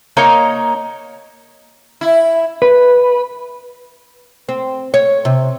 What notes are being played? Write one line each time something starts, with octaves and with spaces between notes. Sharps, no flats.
A#3 D#4 C#5 A#5
E4
B4
C4
C#5
C3